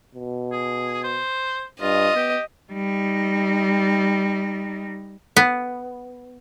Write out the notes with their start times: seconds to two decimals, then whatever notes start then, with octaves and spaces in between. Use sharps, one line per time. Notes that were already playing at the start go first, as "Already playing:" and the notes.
0.15 B2
0.52 G#4
1.04 C5
1.81 G2 F4 D#5
2.15 B3 G4
2.72 G3 D#4
5.37 B3